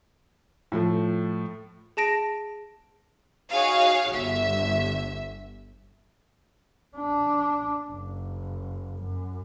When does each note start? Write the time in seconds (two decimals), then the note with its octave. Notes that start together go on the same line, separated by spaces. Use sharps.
0.72 A2 F3 A3
1.97 G#4 A5 A#6 D7
3.50 D#4 F#4 G#4 C#5 F5
4.11 G1 E5
6.97 D4
7.89 F#1
9.04 F#2